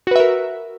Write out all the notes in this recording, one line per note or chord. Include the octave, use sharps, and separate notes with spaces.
F#4 A#4 B4 E5